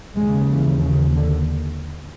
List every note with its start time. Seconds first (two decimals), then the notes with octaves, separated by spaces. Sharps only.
0.16 D#2 C#3 G#3
0.49 E3
0.82 C#3
1.16 D3